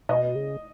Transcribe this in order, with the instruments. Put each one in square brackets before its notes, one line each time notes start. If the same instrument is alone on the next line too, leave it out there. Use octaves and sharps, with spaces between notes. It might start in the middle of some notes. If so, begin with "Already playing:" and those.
[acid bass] B2 [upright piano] D#5
[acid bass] C#3